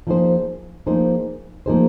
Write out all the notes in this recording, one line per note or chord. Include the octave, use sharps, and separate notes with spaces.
F3 A#3 D#4 G#4 C5
F3 A#3 D#4 G#4 C5
F3 A#3 D#4 G#4 C5